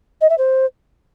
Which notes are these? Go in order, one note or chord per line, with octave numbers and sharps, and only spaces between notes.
D#5
E5
C5